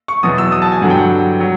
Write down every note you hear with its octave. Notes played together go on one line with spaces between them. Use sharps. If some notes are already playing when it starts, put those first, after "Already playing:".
C#6
E2 B2 F#3 D#6
E6
D#6
A5
G#5
G2 D3 F#3 F#5
G5
F#5
F#3